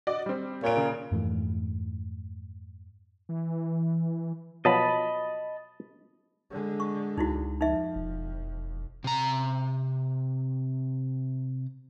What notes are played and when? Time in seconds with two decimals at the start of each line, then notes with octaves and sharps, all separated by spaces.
0.07 F#4 D5 D#5
0.26 G3 C4
0.64 A#2 C#5 D7
0.77 C#3
1.12 F2 G#2 E3 A3
3.29 E3
4.65 B2 F3 F#3 D#5 A5 B5
6.51 D3 G#3
6.80 C#6
7.17 C#2 D#4 E4 F#4
7.61 F2 F3 D#4 E5
7.96 E1
9.04 C3 A#5